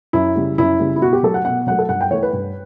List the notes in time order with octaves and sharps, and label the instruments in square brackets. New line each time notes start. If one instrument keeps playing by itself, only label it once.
[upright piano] F#2 E4
C#3 G3
F#2 E4
C#3 G3
E4
B2 F#4
G4
F#3 A3 A4
F#5
B2 F#5
F#3 A3 F#5
A4
G2 F#5
G5
E3 A3 C#5
B4
G2